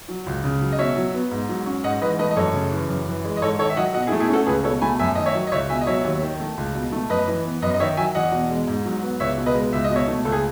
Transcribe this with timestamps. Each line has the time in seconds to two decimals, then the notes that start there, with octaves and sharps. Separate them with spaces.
0.08 F#3
0.26 C#2
0.44 C#3
0.61 F#3
0.72 D#5
0.79 B2 C#5 E5
0.96 F#3
1.14 B3
1.31 G#2
1.49 F#3
1.66 C#4
1.84 G#2 D#5 F#5
2.02 E3 B4 D#5
2.19 A3 B4 D#5
2.31 D#5
2.36 F#2 A4 C#5
2.54 C#3
2.72 E3
2.89 F#2
3.07 E3
3.24 G#3
3.37 D#5
3.42 G#2 A4 C#5
3.59 D#3 A4 C#5
3.70 E5
3.77 F#3 D#5 F#5
3.94 B2 D#5 F#5
4.07 E4 G#4
4.12 A3
4.20 E4 G#4
4.29 C#4 F#4 A4
4.47 C#2 G#4 B4
4.64 B2 A4 C#5
4.81 A3 G#5 B5
4.99 F#2 E5 G#5
5.15 D#3 D#5
5.26 C#5 E5
5.35 F#3
5.47 D#5
5.52 C#2 C#5 E5
5.69 B2 E5 G#5
5.81 D#5
5.87 F#3 C#5 E5
6.04 D#2
6.22 D#3
6.40 A3
6.57 C#2
6.75 B2
6.92 A3
7.09 F#2 B4 D#5
7.27 E3
7.44 B3
7.62 F#2 B4 D#5
7.74 D#5
7.80 D#3 C#5 E5
7.97 F#3 E5 G#5
8.15 E2 D#5 F#5
8.32 B2
8.50 G#3
8.67 G#2
8.85 F#3
9.02 B3
9.20 C#2 C#5 E5
9.38 B2
9.46 B4 D#5
9.55 G#3
9.72 C#2 E5
9.84 D#5
9.90 B2
9.95 C#5 E5
10.08 A3
10.25 C#2 A4
10.32 G#4